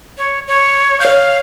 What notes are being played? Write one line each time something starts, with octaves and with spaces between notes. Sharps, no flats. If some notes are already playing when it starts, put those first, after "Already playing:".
C#5
C#5
C#5 F5 G6